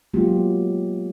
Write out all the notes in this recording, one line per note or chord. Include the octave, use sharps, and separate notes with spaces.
F#3 G#3 A#3 B3 F4 G4